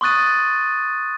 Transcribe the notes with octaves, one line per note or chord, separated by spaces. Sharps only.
C6 C#6 D#6 F#6 A6 D#7